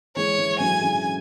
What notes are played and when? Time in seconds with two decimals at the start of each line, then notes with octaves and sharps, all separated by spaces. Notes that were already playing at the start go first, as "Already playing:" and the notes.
0.16 E3 G#3 C#5
0.38 E3 G#3
0.60 D3 F#3 G#5
0.81 C#3 E3